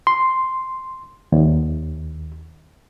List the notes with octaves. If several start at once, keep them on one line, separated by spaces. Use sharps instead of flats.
C6
D#2